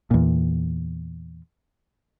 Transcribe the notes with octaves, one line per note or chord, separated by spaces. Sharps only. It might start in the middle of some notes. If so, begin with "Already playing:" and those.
E2 A#2